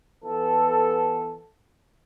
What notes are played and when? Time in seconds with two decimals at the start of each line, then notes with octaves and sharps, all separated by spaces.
0.24 E3 B3 A4